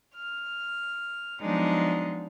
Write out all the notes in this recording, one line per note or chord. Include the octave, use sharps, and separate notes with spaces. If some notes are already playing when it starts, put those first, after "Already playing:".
F6
F3 F#3 G#3 B3 D4 D#4